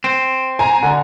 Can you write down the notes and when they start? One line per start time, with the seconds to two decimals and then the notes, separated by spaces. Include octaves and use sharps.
0.04 C4
0.59 G#5 A#5
0.83 D3